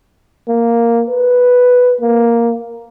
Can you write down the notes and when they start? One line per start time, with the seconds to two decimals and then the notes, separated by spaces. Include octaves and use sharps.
0.49 A#3
1.10 B4
2.01 A#3